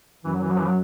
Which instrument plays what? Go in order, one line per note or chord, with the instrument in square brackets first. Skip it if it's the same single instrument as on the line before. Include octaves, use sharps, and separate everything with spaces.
[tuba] F#2 [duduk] E3
[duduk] F#3
E3
F#3
E3
F#3